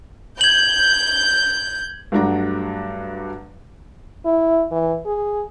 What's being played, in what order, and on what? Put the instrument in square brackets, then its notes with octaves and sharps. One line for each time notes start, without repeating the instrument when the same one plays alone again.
[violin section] G6 [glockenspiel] G#6 F#7
[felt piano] G2 F#3 A3 D4 F#4 A#5
[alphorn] E4
E3
G#4